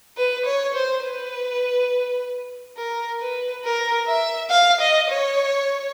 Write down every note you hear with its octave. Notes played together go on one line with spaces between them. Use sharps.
B4
C#5
C5
B4
A#4
B4
A#4
E5
F5
D#5
C#5